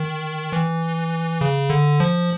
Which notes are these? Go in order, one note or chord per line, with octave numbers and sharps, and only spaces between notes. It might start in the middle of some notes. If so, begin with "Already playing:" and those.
Already playing: D#3
E3
C#3
D3
F3